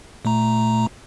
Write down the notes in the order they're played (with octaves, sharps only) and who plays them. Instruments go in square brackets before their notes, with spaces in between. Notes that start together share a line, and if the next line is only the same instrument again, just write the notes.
[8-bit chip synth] A#2 A3 A#5